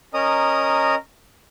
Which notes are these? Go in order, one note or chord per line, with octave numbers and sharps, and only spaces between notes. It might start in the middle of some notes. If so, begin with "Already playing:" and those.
C#4 A#4 D#5 A#5 D#6